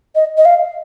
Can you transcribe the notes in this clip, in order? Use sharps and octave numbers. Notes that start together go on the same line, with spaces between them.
D#5
D#5
F5